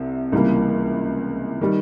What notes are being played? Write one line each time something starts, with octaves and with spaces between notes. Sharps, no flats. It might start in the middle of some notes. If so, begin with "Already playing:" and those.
Already playing: C2 C3
C#2 C3 E3 G3 A#3
D#3 G3